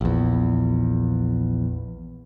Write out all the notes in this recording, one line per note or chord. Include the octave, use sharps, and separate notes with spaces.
A#1 E2